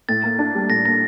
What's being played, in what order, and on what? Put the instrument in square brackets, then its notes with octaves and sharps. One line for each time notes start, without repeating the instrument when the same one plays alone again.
[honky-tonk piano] A2 [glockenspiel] A6
[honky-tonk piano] A#3
D4
G3
[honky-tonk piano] A2 [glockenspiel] A#6
[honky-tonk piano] A#3 [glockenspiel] A#6